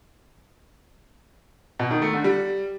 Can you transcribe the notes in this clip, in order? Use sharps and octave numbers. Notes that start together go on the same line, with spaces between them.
B2
D#3
A3
D3
G3